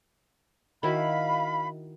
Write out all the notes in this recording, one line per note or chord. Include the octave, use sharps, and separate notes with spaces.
D#3 E4 F#4 F5 B5